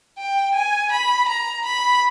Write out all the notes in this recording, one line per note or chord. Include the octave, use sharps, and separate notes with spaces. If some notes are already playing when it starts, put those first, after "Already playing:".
G5
G#5
B5
A#5
B5